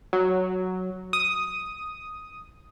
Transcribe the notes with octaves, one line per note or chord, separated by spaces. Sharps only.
F#3
D#6